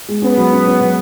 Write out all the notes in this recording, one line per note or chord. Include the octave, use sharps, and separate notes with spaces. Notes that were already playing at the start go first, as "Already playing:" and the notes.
G#3
B3 C#4
F#3
C#4
C#4
F#3